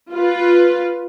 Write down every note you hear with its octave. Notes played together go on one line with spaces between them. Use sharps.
F4 B4